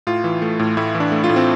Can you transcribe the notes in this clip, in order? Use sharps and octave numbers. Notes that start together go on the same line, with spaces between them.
A2 F4
E3
A3
A2
A2 E4
E3
D4
A3
F4
A2
C4